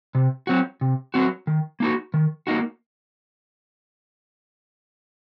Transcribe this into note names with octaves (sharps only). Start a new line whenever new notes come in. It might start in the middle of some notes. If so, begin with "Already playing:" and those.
C3
F#3 C4 F#4
C3
F#3 C4 F#4
D#3
A#3 D#4 F#4
D#3
A#3 D#4 F#4